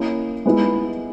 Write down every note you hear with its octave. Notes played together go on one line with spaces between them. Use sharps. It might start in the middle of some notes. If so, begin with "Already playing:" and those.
Already playing: A#3 C#4 E4
G#3 B3 E4